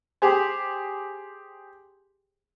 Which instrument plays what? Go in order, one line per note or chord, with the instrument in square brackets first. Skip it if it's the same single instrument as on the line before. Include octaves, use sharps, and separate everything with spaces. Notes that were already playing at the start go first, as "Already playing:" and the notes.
[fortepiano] G4 G#4 C5